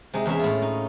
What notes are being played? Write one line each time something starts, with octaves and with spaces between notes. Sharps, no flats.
C3 G#3 D#4
E2 C#4 G#4 E5
A2 F4
D#4